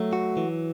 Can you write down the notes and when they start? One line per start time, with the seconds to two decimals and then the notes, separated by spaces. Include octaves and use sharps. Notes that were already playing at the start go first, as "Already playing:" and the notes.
Already playing: F#3 A3
0.13 F#4
0.37 E3